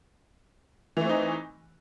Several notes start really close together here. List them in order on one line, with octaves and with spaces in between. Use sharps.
E3 A3 C4 D#4